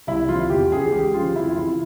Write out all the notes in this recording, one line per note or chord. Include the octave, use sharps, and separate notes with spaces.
C2 E4
C3 F3 F4
E2 G4
C#3 E3 G#4
C#2 G4
C#3 F3 F4
F2 E4
F4
C3 E3 E4